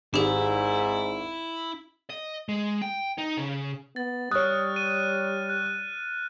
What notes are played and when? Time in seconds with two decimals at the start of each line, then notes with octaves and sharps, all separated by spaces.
0.14 G#1 G#2 E4 G4 G#4
2.10 D#5
2.49 G#3
2.82 G5
3.18 D#4
3.37 C#3
3.96 B3 A6
4.31 G3 C#5 D#6 F6 F#6
4.76 D#7
5.49 F#6